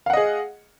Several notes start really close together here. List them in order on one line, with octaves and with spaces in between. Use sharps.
F5 F#5 D#5 G#4